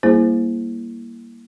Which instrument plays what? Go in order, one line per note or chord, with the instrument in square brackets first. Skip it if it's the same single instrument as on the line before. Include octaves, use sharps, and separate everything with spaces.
[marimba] G3 A#3 E4 G#4 C5